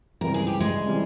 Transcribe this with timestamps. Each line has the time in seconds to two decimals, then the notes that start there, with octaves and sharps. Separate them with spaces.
0.21 C#2 C3 E3 G3 A#4
0.34 G#4
0.47 G4
0.60 G#3 G#4
0.87 C3 E3 G3